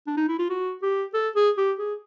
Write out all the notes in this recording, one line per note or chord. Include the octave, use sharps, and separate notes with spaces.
D4
D#4
E4
F4
F#4
G4
A4
G#4
G4
G#4